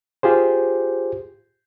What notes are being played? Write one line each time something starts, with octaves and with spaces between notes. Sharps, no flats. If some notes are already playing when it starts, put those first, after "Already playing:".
F4 G4 G#4 C5